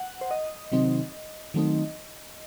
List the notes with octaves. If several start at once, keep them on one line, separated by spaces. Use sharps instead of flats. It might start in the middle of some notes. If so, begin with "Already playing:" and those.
Already playing: F#5
C5
D#5
C3 D#3 F#3 C4 D#4
D#3 F#3 A3 C4 D#4